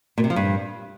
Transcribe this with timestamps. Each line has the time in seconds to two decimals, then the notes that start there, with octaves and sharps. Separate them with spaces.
0.18 A#2
0.24 C3
0.30 F3
0.36 G2